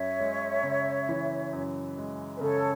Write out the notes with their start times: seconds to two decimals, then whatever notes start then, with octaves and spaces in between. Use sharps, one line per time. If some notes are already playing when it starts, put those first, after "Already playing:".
Already playing: F#2 C#5 E5
0.20 G#3
0.63 C#3
1.09 E3
1.53 F#2
1.98 G#3
2.35 B4
2.41 C#3 A4 C#5